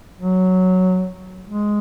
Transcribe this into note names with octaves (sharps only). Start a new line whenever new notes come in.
F#3
G#3